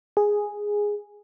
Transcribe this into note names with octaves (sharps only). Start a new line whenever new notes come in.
G#4